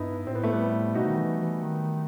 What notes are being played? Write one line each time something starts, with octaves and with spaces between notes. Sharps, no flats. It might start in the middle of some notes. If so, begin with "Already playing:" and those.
Already playing: G2 B3 D#4 E4
A2 C4
B3
A3
G3 B3
B2 D#4 F#4
D#3
E3
E3
D#3